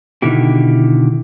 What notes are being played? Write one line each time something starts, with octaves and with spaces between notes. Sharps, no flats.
B2 D3 D#3 E4 G4